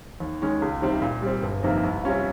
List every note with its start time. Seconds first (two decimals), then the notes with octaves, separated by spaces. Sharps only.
0.20 D#2
0.42 D#3 G#3 C#4
0.62 C#2
0.82 C3 D#3 G3 C4
1.02 A#2
1.22 G3 C4
1.43 G1
1.63 F2 C3 D#3 A#3
1.83 C2
2.03 C3 G3 C#4 F4